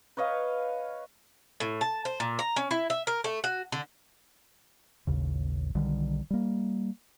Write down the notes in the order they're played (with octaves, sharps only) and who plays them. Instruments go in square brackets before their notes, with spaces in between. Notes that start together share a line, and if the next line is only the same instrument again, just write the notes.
[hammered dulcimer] B4 C#5 D#5 F5
[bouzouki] A2
A5
C5
A#2
A#5
C#4
E4
E5
A#4
A3
F#4
D3
[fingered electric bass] A1 D#2 C#3
B1 D3 D#3 G3
G3 A#3